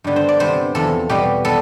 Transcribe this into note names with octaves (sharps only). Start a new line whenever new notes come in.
G2 D3 G3 B3
C5
D5
C3 G3 B3 C5
E2 C3 F3 A4
B2 G3 B3 G4
G3 B3 A4